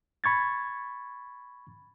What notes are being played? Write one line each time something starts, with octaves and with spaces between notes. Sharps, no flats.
B5 C#6 G#6 A6